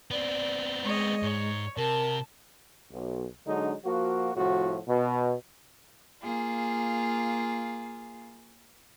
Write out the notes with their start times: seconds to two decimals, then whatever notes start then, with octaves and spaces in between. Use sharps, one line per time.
0.11 B3 C4 D5
0.84 G#3 C#5 D#5
1.23 G#2 C#5
1.77 C3 A#4 A5
2.91 B1
3.46 D3 F#3 G#3 D4 D#4
3.85 F3 A#3 F#4
4.35 C2 A2 F3 F#4
4.88 B2
6.23 A#3 F4 G#4